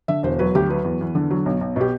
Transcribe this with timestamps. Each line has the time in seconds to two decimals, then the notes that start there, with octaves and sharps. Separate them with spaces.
0.08 D3 E5
0.23 E1 C5
0.39 F#3 B4
0.55 D2 G4
0.69 F#3 B4
0.84 E2
1.01 E2
1.15 D3
1.31 F#3
1.46 B1
1.61 B1
1.76 B2 G4